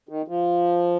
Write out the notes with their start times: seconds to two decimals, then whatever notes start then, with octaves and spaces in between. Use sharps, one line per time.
0.09 D#3
0.28 F3